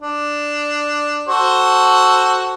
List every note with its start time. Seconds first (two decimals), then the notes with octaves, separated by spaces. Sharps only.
0.02 D4
1.29 F#4 A4 C5